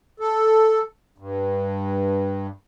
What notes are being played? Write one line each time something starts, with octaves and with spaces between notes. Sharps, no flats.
A4
G2